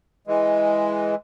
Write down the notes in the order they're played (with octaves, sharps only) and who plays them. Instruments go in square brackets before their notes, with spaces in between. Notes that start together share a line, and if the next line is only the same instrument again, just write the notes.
[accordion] E3 G#3